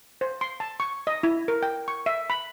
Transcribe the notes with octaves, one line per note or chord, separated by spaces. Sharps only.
C5
C6
A5
C#6
D#5
E4
A#4
G5
C#6
E5
B5